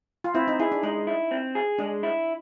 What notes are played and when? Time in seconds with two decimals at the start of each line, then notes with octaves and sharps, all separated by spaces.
0.24 F4
0.35 C4 E4
0.48 D#4
0.60 E4 G#4
0.72 D4
0.83 G#3 D#4
1.07 E4
1.31 C4
1.55 G#4
1.79 G#3 D4
2.03 E4